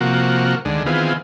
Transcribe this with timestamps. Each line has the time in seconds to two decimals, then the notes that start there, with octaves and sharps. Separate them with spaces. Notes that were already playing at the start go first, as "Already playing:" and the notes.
0.01 C3 F3 A#3 F#4
0.65 D2 D3 D#3 G#3
0.86 D#3 E3 B3 C4 F4 G#4